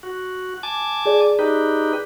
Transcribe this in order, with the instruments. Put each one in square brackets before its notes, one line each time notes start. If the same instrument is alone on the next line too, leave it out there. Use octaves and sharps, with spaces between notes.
[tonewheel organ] F#4
G#5 A5 D6
[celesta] G#4 D5
[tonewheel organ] D#4 G4 B4